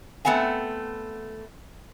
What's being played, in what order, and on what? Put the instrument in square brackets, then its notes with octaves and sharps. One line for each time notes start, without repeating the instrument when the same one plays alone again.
[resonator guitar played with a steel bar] A3 B3 C4 F#5 G#5